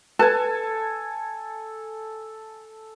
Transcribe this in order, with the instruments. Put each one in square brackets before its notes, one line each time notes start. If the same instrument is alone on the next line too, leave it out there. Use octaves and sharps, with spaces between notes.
[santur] A4 G#5 [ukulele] B4 A5